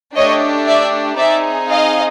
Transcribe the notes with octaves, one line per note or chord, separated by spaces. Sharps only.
A3 D4 G4 C#5 D#5
D5 E5
C4 D#4 G#4 D5 E5
D#5 F5